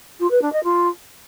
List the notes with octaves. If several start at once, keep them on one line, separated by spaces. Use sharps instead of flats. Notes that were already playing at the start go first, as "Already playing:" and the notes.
F4
B4
D4
D#5
F4